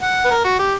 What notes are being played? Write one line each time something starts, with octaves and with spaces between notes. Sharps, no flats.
F#5
B4
A#4
F#4
G4